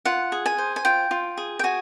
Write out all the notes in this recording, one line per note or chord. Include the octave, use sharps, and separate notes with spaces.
F4 F#5
G#4
G#5
C5
G#5
F4 G5
F4
G#4
G5
F#4 G#5